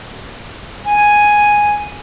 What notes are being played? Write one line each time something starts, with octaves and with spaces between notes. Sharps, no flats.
G#5